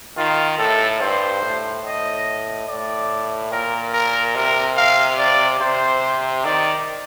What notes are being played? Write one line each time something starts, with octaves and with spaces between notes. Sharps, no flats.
D#3 F4
A2 A4
G2 C5
A2
A2 D#5
A2 D5
A#2 A#4
A#4
C3 A#4
F5
D5
C3 C5
D#3 D5